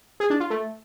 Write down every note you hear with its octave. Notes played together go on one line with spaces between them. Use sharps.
G#4
D4
F4
A3